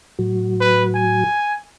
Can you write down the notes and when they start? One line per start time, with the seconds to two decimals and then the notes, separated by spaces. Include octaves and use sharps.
0.19 A2 F#3 F#4
0.60 B4
0.95 G#5